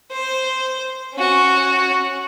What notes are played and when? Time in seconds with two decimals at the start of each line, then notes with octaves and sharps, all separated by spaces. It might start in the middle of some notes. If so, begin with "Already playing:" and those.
0.12 C5
1.15 C#4 F#4